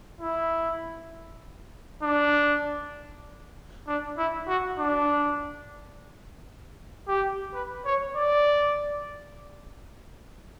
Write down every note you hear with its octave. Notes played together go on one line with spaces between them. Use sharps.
E4
D4
D4
E4
F#4
D4
G4
B4
C#5
D5